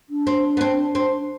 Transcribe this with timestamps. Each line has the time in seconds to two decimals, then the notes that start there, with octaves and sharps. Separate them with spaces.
0.09 D4
0.27 C4
0.57 B3
0.61 C4
0.95 C4